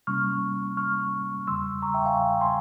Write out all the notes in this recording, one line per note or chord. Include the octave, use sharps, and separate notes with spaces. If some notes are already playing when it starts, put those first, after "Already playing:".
C3 G3 A#3 C#4 C#6 F6
C#6 F6
E2 C#3 G3 C6 E6
A#5 C#6
E5 G5
F5 G#5
G#5 C6